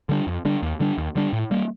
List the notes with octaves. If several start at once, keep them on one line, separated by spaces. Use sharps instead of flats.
D3 G3 D4
F2
D3 G3 D4
D#2
D3 G3 D4
D#2
D3 G3 D4
A2
G3 A#3